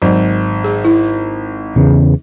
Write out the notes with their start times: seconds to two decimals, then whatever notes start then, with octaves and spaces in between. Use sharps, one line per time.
0.02 G#1 F#3
0.64 G#4
0.85 E4
1.76 E2 C#3